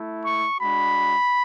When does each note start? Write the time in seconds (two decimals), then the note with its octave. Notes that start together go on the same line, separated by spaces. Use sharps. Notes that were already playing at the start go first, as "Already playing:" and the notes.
Already playing: A3 E4
0.25 C#6
0.61 G#3 D4 F#4 B5